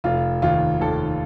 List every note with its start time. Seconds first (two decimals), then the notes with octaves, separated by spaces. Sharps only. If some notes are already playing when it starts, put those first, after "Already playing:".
0.04 F1 F4
0.42 D#2 F4
0.81 D#2 A4